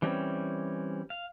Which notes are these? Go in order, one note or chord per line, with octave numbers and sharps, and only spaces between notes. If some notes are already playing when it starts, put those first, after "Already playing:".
E3 G3 C4 C#4
F5